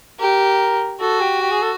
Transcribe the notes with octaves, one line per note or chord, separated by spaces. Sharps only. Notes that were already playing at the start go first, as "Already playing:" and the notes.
G4 A#4
F#4 A4
G4
G4
G#4
A4